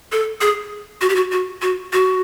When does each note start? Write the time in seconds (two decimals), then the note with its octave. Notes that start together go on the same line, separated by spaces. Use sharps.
0.12 A4
0.41 G#4
1.01 F#4
1.10 G4
1.16 F#4
1.32 F#4
1.62 F#4
1.93 F#4